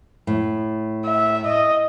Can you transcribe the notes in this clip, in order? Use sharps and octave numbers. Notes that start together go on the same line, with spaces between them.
A2
E5
D#5